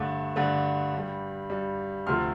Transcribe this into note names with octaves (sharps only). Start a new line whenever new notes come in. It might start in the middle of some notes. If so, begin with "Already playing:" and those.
Already playing: G2 D3 A3 A5 D6
G2 D3 A3
G2 G3
G2 G3
D2 C3 F3 A3 C6 F6